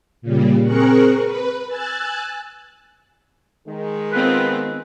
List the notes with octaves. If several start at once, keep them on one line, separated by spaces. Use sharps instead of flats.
A#2 C#3 G3
C4 G#4 A#4 C#6 F#6
B4
G#5 E6 F#6 A6
D#3 G#3
B3 C4 F4 B4